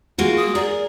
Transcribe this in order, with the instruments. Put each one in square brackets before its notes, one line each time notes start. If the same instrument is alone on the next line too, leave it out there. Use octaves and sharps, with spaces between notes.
[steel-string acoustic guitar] G#3 A#3 F#4 [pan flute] F4
[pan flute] D#6
[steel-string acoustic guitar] G#4 A#4 [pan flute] D5